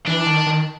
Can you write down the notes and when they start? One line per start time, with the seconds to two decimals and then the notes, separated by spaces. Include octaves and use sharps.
0.07 E3 D4
0.26 D#3
0.47 D#3